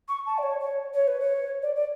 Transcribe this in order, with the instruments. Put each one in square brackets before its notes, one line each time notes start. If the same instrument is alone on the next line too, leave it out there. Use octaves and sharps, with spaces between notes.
[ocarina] C#6
A5
D5
C#5
C#5
C#5
B4
C#5
D5
D5